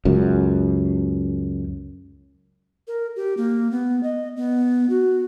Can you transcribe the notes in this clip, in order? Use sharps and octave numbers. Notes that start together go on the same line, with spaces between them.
C#2 F#2
A#4
G4
A#3
B3
D#5
B3
F#4